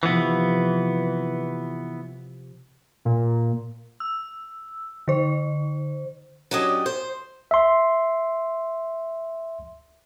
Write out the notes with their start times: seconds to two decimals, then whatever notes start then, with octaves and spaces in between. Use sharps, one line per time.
0.03 C3 E3 F3 B3
3.05 A#2
4.00 E6
5.08 D3 C5
6.51 F#3 C#4 D4 G4 D#5
6.86 C5
7.51 E5 C6